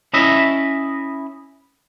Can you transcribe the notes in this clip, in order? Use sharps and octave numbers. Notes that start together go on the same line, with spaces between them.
C#4 E4 D#5 E5